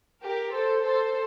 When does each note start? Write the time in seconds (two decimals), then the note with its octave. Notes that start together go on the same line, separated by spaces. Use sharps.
0.24 G4 A#4
0.54 A4 C5
0.85 A4 C5